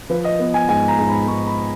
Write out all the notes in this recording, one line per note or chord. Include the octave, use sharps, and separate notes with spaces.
F3 B4
D#5
B3
G#5
G#2 G#5
A#5
G#2
B5
G#2 C#6
B5